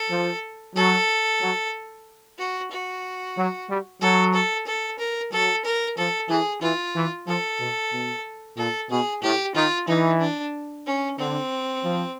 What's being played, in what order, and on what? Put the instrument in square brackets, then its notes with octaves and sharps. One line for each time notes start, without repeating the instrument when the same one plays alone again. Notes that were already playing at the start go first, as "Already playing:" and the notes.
Already playing: [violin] A4
[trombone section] F3
[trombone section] F#3 [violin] A4
[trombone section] F#3
[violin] F#4
F#4
[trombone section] F#3
G3
[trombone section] F#3 [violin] A4
[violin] A4
A4
A#4
[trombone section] F#3 [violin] A4
[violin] A#4
[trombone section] F3 [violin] A4
[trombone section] E3 [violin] G#4
[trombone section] E3 [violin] F4
[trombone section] E3
[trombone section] F3 [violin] A4
[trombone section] B2
B2
[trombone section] A#2 [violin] A4
[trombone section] B2 [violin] G#4
[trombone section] A2 [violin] G4
[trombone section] D#3 [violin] F4
[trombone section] E3 [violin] D#4
[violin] D4
C#4
[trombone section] D3 [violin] C4
[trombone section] F3